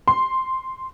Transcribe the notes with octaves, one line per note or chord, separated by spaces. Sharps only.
C6